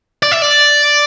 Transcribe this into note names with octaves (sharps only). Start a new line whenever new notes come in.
D5
E5
D5